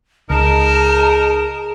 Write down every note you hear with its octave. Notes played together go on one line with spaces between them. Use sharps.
C#2 D#4 G#4 A#4 A5